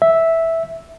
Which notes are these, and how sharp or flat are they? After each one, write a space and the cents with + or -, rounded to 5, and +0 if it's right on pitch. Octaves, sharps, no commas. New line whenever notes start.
E5 -5